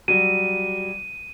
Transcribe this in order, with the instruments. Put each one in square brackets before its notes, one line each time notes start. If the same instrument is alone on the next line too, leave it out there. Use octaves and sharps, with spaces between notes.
[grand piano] F#3 G3 [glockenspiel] D#7